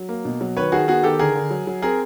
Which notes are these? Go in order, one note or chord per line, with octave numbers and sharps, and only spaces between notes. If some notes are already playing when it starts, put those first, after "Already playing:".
Already playing: F#3
A#3
B2
F#3
D#3 B4 C#5
D#3 F#4 G#4
B3 F#4 G#4
D#3 G4 A4
D3 G#4 A#4
D3
F#3
F#3
C4 G#4 A#4